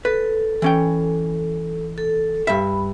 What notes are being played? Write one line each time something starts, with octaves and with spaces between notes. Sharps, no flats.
A4 B4
E3 C#4 G5
A4
G2 E5 B5